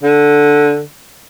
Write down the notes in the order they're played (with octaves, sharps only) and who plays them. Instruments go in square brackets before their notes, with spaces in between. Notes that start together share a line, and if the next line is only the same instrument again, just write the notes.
[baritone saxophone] D3